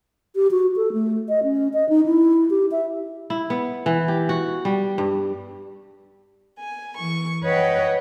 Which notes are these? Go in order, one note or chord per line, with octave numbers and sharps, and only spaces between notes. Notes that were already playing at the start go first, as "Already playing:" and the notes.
G4
F#4
A4
A3
D#5
C#4
D#5
D#4
E4
G4
E5
E4
B3
E3
G4
F#4
G3
G2
G#5
E3 C#6
B4 C#5 D#5 F#5 G5